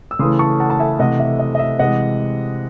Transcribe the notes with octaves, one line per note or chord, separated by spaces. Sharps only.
E6
C#3 E3 A3 C6 D#6
A5 C#6
F#5 A5
A5
E5 G#5
C3 E3 A3 D#5 F#5
E5
D#5
D#5
E5
C3 E3 G#3 D#5 F#5